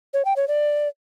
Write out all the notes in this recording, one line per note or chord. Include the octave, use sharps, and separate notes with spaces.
C#5
G5
C#5
D5